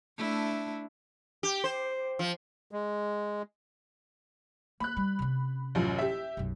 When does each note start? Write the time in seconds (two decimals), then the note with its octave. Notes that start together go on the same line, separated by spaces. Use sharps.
0.18 A3 D4 E4
1.43 G4
1.64 C5
2.19 F3
2.71 G#3
4.80 A#3 B5 F#6
4.97 G3
5.19 C3 C#4
5.75 A1 F#2 F4
5.99 G4 E5
6.37 B1 F#2